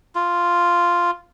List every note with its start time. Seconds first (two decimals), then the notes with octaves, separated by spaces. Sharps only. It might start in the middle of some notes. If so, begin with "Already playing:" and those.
0.15 F4